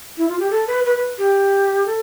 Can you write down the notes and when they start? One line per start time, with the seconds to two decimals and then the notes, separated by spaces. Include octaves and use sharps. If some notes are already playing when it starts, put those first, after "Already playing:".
0.18 E4
0.29 F4
0.39 G4
0.50 A4
0.67 B4
0.85 B4
0.96 B4
1.18 G4
1.86 A4